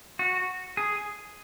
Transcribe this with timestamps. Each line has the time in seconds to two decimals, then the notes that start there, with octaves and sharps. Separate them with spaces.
0.19 F#4
0.77 G#4